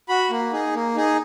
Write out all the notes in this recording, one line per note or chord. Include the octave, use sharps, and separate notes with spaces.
F#4 B5
A#3
D#4 G#4
A#3
D#4 G#4